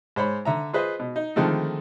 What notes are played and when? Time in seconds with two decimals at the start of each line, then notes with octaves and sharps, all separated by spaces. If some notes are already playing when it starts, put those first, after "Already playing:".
0.16 G#2 C5 C#5 B5
0.45 D3 E5 A#5
0.73 F4 G#4 B4 C5 D#5
1.00 B2
1.16 D#4
1.36 D3 D#3 F3 G#3 A3 C4